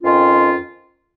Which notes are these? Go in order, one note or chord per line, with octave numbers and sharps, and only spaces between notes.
F2 D#3 C#4 F4